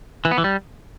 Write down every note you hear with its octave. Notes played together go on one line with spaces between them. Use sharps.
E3
B3
E3
G3